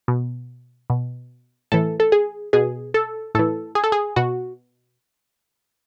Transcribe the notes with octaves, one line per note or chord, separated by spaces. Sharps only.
B2
B2
A2 E3 A4
A4
G#4
B2 G#4
A4
A2 E3 A4
G#4
A4
G#4
B2 F#4